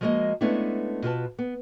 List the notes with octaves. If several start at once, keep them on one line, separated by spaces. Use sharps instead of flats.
F3 G#3 A#3 F#4 D#5
G#3 A3 B3 C#4 D4 E4
B2 F4 B4 A5
B3